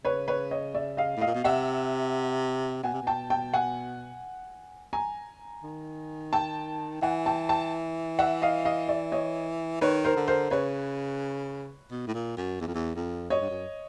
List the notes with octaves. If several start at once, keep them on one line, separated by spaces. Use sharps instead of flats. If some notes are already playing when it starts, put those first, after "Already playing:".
C#3 B4 C#5
B4 C#5
C#5 D#5
D5 E5
D#5 F5
A2
D#5 F5
A#2
B2
C3 E5 F#5
B2 F#5 G#5
C3
B2 G5 A5
G5 A5
F#5 G#5
G#5 A#5
D#3
G5 A5
E3 F#5 G#5
G5 A5
G5 A5
E5 F#5
D#5 F5
D#5 F5
D5 E5
C#5 D#5
D#3 B4 C#5
A#4 C5
D3
A#4 C5
C#3 B4 C#5
B2
A2
A#2
F#2
E2
F2
E2
F2
F#2 C#5 D#5
G2
F#2